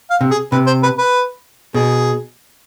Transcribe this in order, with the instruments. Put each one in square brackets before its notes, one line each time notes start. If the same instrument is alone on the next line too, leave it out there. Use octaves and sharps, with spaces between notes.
[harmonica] F5
[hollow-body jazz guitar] C3
[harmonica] G#4
[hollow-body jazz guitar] C3 [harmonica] B4
[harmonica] C5
B4
B4
[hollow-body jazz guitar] B2 [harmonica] G#4